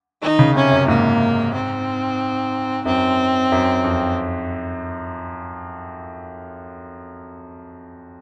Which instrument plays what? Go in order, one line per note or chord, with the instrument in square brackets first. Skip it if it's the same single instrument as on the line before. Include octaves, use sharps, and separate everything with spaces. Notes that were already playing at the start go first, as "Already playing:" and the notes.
[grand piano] D#3 [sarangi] D#4
[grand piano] C#3
[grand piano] C3 [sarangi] C#4
[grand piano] F#2
[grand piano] G#2 [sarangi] A#3
[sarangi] C4
[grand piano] F#2 [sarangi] C4
[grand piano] F#2
F2